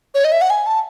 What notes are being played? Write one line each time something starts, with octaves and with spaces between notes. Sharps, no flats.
C#5
D#5
E5
F#5
G#5
A5